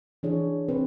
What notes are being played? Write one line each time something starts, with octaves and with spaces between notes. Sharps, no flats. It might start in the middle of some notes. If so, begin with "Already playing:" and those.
E3 D4 G#4 C#5
C4 B4